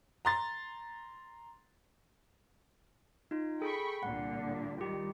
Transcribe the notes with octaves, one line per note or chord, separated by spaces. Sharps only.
A#5 C6 A6
D#4 F4
G#4 A4 G5 B5 C#6
C2 A#2 D3 F#5
D#3 G3 F4 G4